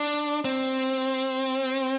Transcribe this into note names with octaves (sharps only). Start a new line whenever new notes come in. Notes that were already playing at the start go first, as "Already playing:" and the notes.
Already playing: D4
C4